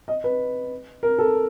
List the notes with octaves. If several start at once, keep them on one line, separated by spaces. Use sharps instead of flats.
D#5
B4
A#4
A4